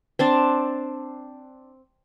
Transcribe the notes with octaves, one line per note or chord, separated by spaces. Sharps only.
C4 D4 A5